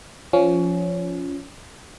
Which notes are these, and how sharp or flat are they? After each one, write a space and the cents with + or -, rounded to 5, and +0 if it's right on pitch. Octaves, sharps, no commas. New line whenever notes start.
F3 +0 C#4 +20